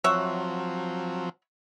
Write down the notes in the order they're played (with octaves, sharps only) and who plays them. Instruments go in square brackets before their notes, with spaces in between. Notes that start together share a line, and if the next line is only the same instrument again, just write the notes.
[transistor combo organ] F3 F#3 C4 [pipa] C#5 E5 F#5